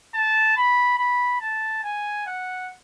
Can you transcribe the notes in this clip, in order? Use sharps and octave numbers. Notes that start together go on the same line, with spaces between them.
A5
B5
B5
A5
G#5
F#5